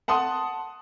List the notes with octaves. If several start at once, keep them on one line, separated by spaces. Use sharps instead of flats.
F#5 A5 C6 D#6